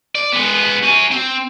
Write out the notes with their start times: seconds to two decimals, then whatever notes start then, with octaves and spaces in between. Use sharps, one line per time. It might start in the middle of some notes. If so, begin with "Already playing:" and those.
0.15 D5
0.32 G#3 B3
0.83 F#4 G#5
1.11 C4